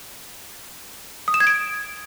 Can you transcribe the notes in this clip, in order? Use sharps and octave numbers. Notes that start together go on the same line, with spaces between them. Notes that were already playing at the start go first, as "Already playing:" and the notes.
D#6
E7
G#6
D7